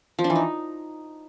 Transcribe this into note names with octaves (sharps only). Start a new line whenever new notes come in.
F3
D4
E3
D#4